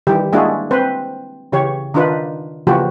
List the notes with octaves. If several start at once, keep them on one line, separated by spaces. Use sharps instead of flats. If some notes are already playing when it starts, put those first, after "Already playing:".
D#3 E3 G3 G4
G#3 A#3 D4 E4 F#4 G#4
C4 B4 C5
C#3 E3 G4 C#5
D#3 D4 D#4 F4 B4
C#3 E3 F3 A#3 F#4 G4